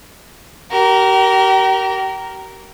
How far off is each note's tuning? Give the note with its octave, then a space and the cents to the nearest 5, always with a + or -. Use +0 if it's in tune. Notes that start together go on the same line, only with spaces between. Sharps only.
G4 -35 A#4 +5